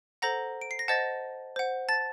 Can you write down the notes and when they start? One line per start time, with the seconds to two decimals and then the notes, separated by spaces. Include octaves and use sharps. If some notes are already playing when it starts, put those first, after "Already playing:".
0.22 A4 C5 F#5 A#5 A#6
0.61 D7
0.71 C7
0.79 A#6
0.88 C5 D#5 F#5 A5 A6
1.56 C5 F#5
1.89 A5 A6